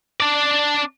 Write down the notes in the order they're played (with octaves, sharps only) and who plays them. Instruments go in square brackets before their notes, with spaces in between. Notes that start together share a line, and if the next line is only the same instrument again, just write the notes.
[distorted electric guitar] D4 D5